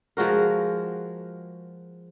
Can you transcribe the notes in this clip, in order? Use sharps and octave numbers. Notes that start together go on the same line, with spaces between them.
F3 G#3 F#4 A#4